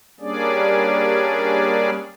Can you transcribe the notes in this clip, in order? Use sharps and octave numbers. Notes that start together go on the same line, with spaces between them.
G3 A#3 C#4 D4 G#4 D5